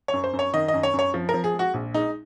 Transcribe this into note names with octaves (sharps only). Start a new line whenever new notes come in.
C#5
F#2
C5
F#2
C#5
D#3 D#5
D#5
F#2
C#5
F#2
C#5
F3
F3 A#4
G#4
G#3 F#4
A#1
G#3 D#4